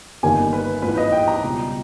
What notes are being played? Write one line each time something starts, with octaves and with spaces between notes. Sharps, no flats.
G1 G2 D#3 A#3 G#5
B4
A#1 G#2 E3 B4
D#5
G5
A#5
C#2 B2 G3